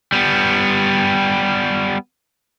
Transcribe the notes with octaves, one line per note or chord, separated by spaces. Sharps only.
G3 B3